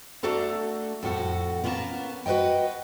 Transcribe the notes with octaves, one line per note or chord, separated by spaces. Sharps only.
A3 D4 F#4 A4 A#5
F2 A2 F#4 A4
A#3 B3 C#4 E5 A5 A#5
F#4 B4 C#5 D#5 G5